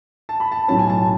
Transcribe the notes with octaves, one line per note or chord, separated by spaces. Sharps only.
A5
B5
A5
B1 A2 F#3 C#4 A5
G#5
A5